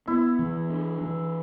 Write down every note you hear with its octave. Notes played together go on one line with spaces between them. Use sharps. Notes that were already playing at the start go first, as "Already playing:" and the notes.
B3 E4
E3
D4
E3